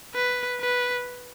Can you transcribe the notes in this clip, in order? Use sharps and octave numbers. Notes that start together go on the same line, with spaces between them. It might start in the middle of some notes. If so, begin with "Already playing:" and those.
B4
B4